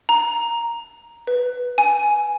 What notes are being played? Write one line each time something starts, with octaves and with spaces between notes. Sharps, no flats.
A#5
B4
G#5